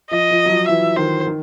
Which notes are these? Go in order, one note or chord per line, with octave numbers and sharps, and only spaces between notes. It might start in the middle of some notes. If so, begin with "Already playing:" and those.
F3 D#5
F3
F#3
F3
E3 E5
D#3 C5
D#3